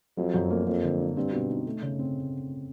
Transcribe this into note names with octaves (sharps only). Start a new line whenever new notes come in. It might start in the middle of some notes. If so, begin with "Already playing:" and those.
F2 F#3
F#2
A#3
F2 A#3
D3
D4
G2 C4
B2
D#4
A3
C#3
C4